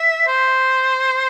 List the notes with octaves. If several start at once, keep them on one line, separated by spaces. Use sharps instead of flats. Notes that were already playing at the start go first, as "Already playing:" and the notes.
Already playing: E5
C5